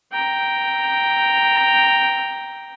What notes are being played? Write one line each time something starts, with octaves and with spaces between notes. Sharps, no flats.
G5 A#5